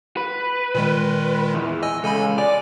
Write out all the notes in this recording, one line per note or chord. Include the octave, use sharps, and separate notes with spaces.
B4
A#2 D#3 G#3
E2
D#5 G#5 E6
C#2 A4 G#5 B5
D5 G#5